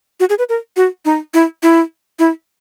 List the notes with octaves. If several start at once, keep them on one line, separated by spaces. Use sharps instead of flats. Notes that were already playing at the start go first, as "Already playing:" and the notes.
F#4
G#4
B4
A#4
F#4
D#4
E4
E4
E4